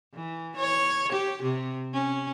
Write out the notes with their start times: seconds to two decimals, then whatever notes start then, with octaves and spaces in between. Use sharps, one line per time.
0.14 E3
0.56 C#5
1.12 G4
1.43 C3
1.93 C#4